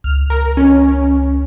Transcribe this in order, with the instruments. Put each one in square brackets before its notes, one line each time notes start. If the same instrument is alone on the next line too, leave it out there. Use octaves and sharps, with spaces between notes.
[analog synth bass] C#2 [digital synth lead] F6
[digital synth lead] A#4
C#4